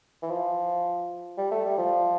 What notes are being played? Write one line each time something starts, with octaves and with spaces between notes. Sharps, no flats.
E3
F3
G3
A3
G3
F3